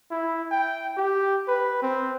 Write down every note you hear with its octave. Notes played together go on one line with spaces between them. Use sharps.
E4
G5
G4
B4
C4